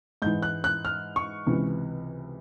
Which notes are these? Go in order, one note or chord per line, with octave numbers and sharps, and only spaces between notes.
G#2 E3 G6
F#6
F#6
F6
C#6
C#2 C3 E3